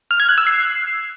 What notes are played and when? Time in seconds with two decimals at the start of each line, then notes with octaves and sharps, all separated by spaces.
0.11 F6
0.20 G#6
0.29 F#6
0.38 E6
0.47 C7